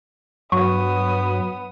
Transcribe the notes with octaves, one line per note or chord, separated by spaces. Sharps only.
G2 F#3 B3 C#6 D#6